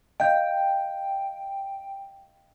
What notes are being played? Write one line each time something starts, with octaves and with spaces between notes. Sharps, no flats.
D#5 F5 G5 G6